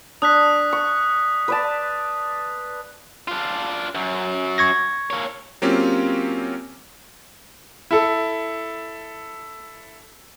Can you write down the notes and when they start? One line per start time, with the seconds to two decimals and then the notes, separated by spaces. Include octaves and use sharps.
0.22 D4 D#6 F#6 B6
0.73 C#6
1.48 B4 D5 A5
3.28 D4 F4
3.95 F#2 F#3
4.58 C#6 G#6 A#6
5.10 A#3 C#5
5.62 F#3 A#3 C4 C#4 F4 G4
7.91 E4 A4